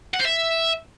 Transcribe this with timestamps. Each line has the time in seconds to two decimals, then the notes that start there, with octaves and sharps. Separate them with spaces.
0.14 F#5
0.19 C5
0.25 E5